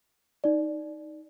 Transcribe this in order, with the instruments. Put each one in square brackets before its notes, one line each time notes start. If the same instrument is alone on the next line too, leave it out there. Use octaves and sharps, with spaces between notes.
[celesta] D#4 D5